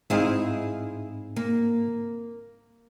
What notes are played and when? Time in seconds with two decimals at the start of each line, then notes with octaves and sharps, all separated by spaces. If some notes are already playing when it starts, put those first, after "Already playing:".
0.10 G#2 C4 D#4 E4 G#4 F5
1.36 A#3